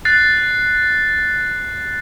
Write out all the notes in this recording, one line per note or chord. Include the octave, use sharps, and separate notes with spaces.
F#6 A6 C7